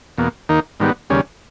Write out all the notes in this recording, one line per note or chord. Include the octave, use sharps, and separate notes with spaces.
E2 B2 A#3
D#2 D#3 A#3 D#4
G#2 D#3 G3 B3
D#2 C#3 G3 C#4